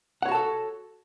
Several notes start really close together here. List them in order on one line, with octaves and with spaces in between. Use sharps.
F#5 C#5 F#4 A5 A4